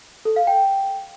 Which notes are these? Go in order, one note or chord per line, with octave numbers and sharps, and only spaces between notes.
A4
F5
G5